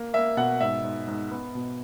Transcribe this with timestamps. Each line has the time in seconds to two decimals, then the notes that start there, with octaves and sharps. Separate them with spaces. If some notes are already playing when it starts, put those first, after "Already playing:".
Already playing: A#3
0.13 A#3 E5
0.37 B2 F#5
0.60 G#2 E5
0.84 G#2
1.07 G#2
1.31 B3
1.55 B2